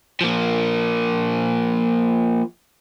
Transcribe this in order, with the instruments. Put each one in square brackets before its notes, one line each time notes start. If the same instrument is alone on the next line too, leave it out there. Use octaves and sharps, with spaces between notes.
[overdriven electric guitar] F3 A#3